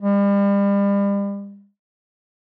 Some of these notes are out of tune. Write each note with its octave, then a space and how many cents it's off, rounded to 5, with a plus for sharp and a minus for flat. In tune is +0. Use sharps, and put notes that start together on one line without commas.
G3 +35